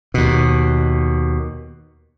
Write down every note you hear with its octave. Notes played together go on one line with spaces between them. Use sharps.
D#2 B2